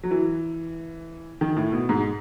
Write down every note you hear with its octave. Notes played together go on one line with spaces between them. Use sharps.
F#3
E3
D#3
A2
B2
G#2